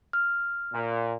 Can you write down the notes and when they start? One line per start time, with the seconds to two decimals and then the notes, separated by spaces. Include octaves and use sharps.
0.13 F6
0.73 A#2